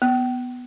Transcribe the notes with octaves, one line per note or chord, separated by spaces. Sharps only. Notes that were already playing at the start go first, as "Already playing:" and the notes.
B3